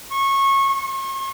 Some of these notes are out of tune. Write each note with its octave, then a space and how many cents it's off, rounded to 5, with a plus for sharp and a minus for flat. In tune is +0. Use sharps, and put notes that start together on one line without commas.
C#6 -20
C#6 -45